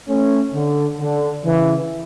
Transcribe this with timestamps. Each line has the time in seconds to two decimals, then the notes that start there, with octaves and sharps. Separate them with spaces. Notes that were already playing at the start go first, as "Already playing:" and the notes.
0.09 A3 C#4
0.54 D3
0.99 D3
1.44 C#3 E3